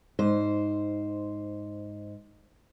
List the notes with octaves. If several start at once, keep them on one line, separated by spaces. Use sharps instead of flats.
G#2 C5